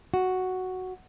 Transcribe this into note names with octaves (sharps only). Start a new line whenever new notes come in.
F#4